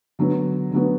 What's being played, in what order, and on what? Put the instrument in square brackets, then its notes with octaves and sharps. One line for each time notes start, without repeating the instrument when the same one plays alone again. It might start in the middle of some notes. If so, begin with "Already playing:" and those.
[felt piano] D3 F#3 B3
D3 F#3 B3